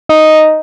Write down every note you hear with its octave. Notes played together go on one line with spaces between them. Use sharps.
D#4